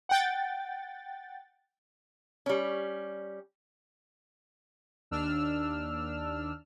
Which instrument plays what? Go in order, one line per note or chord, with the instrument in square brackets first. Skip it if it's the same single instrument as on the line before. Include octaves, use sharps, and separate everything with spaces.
[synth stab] F#5 G5 A6
[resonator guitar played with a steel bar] G3 C#4
[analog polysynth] D#2 D4 E6 F6